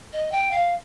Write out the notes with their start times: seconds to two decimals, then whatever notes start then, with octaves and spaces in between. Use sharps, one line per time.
0.13 D#5
0.32 G5
0.51 F5